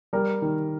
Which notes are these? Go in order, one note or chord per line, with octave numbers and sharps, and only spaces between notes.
G3 A#4
D#3